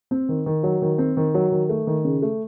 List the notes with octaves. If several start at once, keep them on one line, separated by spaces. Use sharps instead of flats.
C4
D#3
D#3
F#3
D#3
C4
D#3
F#3
D#3
A3
D#3
C#3
A3